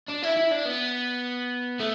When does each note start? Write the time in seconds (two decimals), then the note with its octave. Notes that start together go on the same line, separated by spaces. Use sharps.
0.09 D4
0.23 E4
0.37 E4
0.52 D4
0.66 B3
1.80 A3